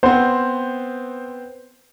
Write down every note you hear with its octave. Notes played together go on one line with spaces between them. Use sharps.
B3 C4 C5